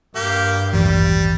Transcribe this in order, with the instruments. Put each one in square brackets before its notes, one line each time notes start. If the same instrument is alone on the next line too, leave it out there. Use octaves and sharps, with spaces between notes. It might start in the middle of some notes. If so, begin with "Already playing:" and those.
[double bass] G2 [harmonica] A#3 G4
[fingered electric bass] A1 D#2 E3 [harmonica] G3